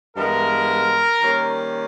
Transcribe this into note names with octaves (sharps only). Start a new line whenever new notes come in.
G2 E3 G#3 B3 A#4
D#3 G3 A#3 C#4